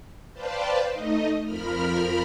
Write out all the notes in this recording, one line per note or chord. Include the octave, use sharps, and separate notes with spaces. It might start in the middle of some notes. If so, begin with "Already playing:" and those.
B4 C5 D5 F5 G5 A5
A3 D#4 D#5
F2 F3 A#4 B5 F6